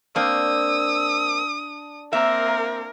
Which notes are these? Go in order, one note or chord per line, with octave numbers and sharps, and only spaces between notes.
A#3 C4 D4 D#6 E6
A#3 C4 A#4 E5